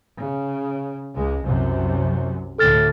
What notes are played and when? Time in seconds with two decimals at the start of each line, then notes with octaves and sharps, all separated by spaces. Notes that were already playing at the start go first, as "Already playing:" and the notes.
0.18 C#3
1.15 C#2 G#3
1.45 C2 F#2 C3
2.58 D2 A2 D3 A4 F6 A6